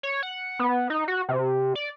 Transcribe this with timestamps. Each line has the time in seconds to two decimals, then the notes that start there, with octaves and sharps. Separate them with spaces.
0.03 C#5
0.23 F#5
0.59 B3
0.90 D#4
1.08 F#4
1.29 C3
1.75 D5